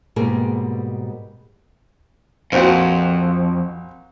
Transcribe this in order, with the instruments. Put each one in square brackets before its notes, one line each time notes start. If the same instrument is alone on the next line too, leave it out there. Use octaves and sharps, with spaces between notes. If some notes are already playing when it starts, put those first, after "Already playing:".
[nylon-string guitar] G#2 B2 G3 A#3 C4 G#4
[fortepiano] A#1 C4 F#4 [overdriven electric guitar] F2